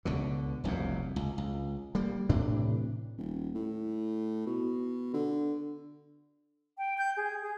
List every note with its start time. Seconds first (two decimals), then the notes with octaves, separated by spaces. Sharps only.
0.05 C#2 B2 D3
0.64 F1 C2 F#2 A#2
1.16 C#2
1.38 C#2
1.95 G3 A#3
2.29 A2 C3 E3 D4
3.18 D#1
3.55 A2
4.46 B2
5.14 D3
6.78 G5
6.98 G6
7.17 G#4
7.42 G#4